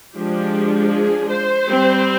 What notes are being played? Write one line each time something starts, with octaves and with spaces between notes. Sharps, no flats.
F3 G#3 D4 G4
G#4
C5
G3 C4